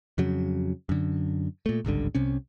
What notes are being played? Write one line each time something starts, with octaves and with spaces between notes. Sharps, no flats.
F2 C#3 F#3
F#2 D3
A#2 A3
G#1 C#2 G2 D3
C2 C3 C#4